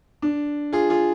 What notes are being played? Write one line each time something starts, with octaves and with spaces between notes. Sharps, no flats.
D4
F4 G#4
F4 G#4